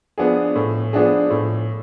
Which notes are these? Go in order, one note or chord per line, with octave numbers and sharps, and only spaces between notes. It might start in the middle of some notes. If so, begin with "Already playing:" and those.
F3 B3 D4 G#4
A2
F3 B3 D4 G#4
A2